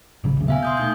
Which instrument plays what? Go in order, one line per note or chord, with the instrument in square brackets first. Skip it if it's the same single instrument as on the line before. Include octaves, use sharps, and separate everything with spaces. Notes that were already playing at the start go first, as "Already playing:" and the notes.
[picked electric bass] G#1 C#3 F#3
D2 C#3
[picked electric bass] B2 B3 [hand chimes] E5 F5 G#5
[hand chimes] C6 D#6 G6
A3 D#4 G6